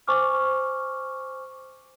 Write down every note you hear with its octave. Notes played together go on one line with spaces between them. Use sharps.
C5 G#5 C#6 D6 F6